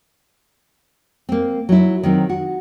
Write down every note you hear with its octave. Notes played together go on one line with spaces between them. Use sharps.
A#3 C4
F#3 E4
D#3 F#3 C4
F#4